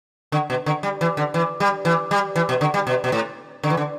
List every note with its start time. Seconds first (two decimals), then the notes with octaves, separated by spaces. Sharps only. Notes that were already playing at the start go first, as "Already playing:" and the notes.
0.32 D3
0.50 B2
0.66 D3
0.83 G3
1.01 E3
1.17 D3
1.34 E3
1.60 G3
1.85 E3
2.11 G3
2.36 E3
2.49 B2
2.61 D3
2.74 G3
2.87 B2
3.04 B2
3.12 A2
3.63 D3
3.70 E3
3.77 D3